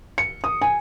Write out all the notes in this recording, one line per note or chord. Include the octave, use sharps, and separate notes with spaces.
C#7
D#6
G#5